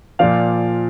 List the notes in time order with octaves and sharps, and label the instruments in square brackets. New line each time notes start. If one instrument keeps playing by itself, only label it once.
[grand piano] A#2 F3 D5 F5